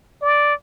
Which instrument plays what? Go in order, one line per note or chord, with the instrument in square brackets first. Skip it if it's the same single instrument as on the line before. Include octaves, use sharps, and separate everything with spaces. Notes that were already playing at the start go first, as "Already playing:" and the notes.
[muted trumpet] D5